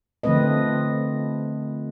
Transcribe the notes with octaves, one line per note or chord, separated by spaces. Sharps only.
D3 F3 A3 C4 B4 D#5